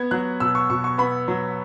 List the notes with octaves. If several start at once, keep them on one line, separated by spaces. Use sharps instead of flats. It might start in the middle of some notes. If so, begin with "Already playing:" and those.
Already playing: B3 G#6
F#3 F#6
B2 E6
C#6
B2 C#6
C#6
B3 B5
F#3